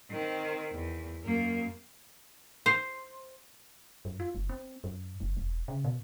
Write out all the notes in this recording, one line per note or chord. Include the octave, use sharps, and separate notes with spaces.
D#3 C4
E2
F#2 A#3
C5
F#2
F4
F#1
C4
F#2
F#1
E1
C#3
B2